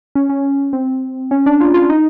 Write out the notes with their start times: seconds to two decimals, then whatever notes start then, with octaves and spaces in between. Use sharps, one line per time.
0.15 C#4
0.29 C#4
0.73 C4
1.31 C#4
1.46 D4
1.61 F4
1.74 F4
1.90 D#4